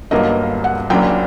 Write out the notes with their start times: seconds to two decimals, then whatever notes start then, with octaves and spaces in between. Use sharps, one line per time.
0.11 G1 G2 F#3 A#3 D#5
0.64 F#5
0.90 F#1 F#2 F#3 A#3 D4 G5